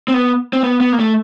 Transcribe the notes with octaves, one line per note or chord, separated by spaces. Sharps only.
C4
B3
C4
B3
B3
A#3
A3